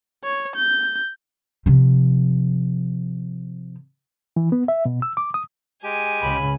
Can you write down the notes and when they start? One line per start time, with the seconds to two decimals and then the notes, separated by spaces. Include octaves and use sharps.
0.24 C#5
0.56 G6
1.66 C3 F3
4.36 E3
4.52 B3
4.68 E5
4.85 B2
5.02 E6
5.17 D6
5.34 D#6
5.84 G#3 G4 G#5
6.21 C#2 C#3 B5